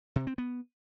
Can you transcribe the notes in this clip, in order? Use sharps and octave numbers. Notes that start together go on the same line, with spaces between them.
C3
C4
B3